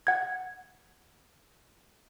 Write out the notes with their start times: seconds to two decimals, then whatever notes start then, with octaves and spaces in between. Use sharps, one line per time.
0.07 F#5 G#6